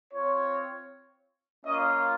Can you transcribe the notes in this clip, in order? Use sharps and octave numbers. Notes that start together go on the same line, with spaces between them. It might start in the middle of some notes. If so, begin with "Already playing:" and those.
C4 F4 C#5
A#3 C#4 F4 D#5